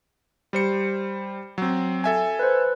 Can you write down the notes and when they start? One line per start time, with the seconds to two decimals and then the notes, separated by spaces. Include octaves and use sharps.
0.53 G3 C5 C#7
1.58 F#3 C4
2.04 A4 E5 G#5
2.39 B4 C5